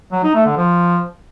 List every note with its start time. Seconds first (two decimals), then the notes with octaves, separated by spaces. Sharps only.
0.12 F#3
0.23 D#4
0.34 A3
0.46 D3
0.57 F3